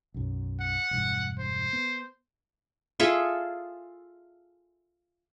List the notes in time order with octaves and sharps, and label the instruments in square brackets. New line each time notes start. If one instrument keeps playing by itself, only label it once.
[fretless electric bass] B1 F#2
[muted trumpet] F#5
[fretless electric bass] E1 G2
[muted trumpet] C5
[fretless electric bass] B3
[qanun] F4 G#4 A4 E5